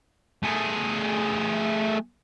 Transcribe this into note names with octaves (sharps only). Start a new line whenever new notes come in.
A3 G#4